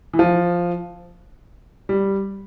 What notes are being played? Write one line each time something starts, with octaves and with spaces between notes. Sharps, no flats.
E3
F3
G3